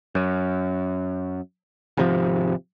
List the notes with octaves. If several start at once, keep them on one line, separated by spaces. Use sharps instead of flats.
F#2
G#1 C3 F3